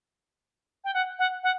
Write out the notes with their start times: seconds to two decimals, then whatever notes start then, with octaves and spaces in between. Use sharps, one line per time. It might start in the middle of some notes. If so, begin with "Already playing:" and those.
0.84 G5
0.94 F#5
1.19 F#5
1.43 F#5